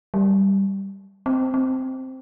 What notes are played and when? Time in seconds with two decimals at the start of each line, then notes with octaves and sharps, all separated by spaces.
0.14 G3
1.26 C4
1.54 C4